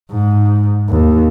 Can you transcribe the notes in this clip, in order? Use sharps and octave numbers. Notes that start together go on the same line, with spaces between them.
G#2
D#2